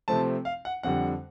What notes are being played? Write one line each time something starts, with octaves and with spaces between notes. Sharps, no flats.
C3 F3 A3 C4 A5
F5
F#5
F2 D3 G3 F#5